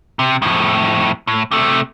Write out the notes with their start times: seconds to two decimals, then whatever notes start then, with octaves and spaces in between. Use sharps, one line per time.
0.19 C3
0.42 F2 A2
1.27 A2
1.52 C3 A3